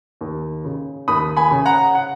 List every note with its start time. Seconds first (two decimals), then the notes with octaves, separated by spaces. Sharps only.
0.21 D#2
0.64 C#3
1.08 D#2 B5 D#6
1.37 G#5 B5
1.51 C#3
1.65 F#5 A#5
1.95 F#5